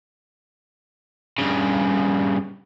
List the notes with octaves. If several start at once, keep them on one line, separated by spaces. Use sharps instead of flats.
G2 C#3